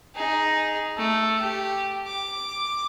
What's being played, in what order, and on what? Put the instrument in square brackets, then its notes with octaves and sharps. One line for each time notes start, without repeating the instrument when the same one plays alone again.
[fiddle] D#4 G#4
A3
G4
D6